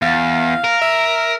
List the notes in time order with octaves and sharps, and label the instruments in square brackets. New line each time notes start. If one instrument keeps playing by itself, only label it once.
[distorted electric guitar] E2 [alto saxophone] F5
[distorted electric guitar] A#4
[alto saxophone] E5